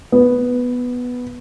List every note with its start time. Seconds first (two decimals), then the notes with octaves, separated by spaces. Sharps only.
0.12 B3